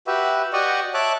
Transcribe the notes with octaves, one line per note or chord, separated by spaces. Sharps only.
F#4 G4 B4 E5
F#4 G4 D5 D#5 F#5 C#6
C#5 E5 A5 D6 F#6